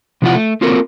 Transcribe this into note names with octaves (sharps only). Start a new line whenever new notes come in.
C3 F3 B3 E4 F4 F#5
A3
A#3 C4 F4 F#4 A4 A#4